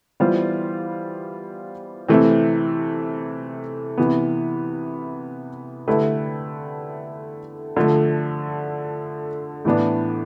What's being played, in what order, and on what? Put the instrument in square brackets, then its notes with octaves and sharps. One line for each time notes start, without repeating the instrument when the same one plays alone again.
[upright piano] E3 G3 B3 F4 C5
C3 E3 A3 C4
C3 E3 B3
D3 A3 E4 G4 B4
D3 F3 A3
A2 E3 B3 D4